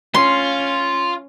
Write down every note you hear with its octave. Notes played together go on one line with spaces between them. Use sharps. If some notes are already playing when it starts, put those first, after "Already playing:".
C#4 F4 C6